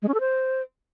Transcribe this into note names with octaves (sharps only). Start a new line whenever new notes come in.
G#3
C#4
A4
C5